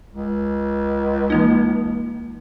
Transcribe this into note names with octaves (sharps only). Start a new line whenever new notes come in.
C#2
E3 A#3 D#4